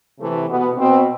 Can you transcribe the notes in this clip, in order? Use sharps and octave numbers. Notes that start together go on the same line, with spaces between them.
C3 E3 A3
B2 B3
B2 C4